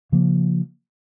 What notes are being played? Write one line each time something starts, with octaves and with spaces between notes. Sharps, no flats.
C#3 F3 A#3